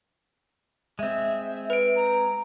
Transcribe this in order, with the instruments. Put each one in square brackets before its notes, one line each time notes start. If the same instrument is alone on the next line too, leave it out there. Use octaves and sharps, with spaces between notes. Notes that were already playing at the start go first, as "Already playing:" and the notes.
[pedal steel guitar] G#3 C4 [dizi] E5
[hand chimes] B4 D7
[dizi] A#5